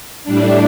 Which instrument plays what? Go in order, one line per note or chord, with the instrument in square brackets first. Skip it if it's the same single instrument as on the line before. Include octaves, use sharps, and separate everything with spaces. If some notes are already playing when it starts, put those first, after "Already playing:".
[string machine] A2 G3 D4